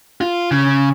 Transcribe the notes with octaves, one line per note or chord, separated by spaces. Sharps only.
F4
C#3